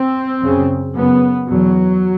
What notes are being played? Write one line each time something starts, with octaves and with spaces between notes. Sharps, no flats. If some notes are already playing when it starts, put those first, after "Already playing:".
Already playing: C4
F#2 C#3
F#2 C#3 B3
E2 B2 F#3